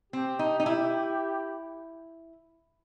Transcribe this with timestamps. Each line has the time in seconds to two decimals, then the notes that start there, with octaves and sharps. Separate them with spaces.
0.13 C4 G4
0.39 D#4
0.60 D#4
0.66 E4